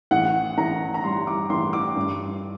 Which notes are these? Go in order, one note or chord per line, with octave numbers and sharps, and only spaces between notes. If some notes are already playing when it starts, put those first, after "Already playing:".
A1 F#5
A1 A#5
A#5
G3 C6
D6
A1 C6
D6
G2